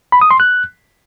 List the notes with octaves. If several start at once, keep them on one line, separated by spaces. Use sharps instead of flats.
B5
D#6
C6
F#6